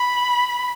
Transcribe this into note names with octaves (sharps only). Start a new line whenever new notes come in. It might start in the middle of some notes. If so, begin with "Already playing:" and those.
Already playing: B5